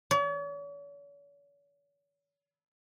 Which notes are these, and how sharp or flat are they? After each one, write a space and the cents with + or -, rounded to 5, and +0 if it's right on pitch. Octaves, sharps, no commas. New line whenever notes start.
C#5 +45